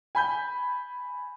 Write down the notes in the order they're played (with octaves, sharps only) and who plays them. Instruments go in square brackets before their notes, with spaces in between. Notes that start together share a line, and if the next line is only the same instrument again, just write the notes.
[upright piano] G#5 B5 G6